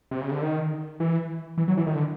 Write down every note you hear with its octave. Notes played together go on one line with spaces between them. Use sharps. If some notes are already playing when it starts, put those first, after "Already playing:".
C3
C#3
D3
D#3
E3
E3
F#3
E3
D#3
D3